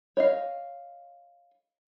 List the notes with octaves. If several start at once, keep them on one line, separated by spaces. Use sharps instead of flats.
C#5 D#5 F5